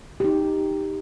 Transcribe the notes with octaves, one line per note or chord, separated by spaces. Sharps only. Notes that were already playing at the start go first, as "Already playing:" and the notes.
D#4 G4